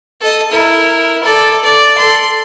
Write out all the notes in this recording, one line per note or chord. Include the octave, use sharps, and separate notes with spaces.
A4 D#5
E4 A#4
A4 D5
D5
A4 C6